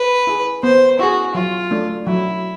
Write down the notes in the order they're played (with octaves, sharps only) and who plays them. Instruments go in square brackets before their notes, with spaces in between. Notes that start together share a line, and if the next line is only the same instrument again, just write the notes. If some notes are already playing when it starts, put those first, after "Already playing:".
Already playing: [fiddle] B4
[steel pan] E4 G#4
[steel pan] B3 [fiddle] C5
[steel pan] E4 G#4 [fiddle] F#4
[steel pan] F#3 [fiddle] F4
[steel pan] A3 D4
[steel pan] F#3 [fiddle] E4